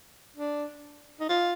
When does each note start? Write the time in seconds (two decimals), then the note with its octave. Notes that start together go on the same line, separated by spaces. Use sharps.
0.37 D4
1.20 D#4
1.29 F4